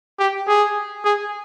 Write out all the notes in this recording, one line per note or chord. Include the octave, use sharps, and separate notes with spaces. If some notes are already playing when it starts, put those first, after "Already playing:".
G4
G#4
G#4